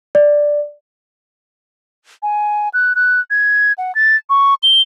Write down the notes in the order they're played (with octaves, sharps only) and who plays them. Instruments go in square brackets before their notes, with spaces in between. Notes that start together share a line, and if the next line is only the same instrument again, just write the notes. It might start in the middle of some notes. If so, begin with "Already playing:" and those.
[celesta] D5
[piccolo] G#5
F#6
F#6
G#6
F#5
A6
C#6
G7